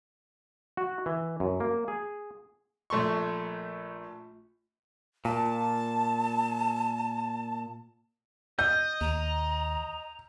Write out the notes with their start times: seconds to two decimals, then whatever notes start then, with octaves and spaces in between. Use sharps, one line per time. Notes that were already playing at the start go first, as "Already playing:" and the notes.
0.77 F#4
1.06 E3
1.40 F#2
1.60 A#3
1.88 G#4
2.90 A#1 A3 C6 C#6
5.25 A#2 A5
8.59 D#5 G6
9.01 D#2 A#5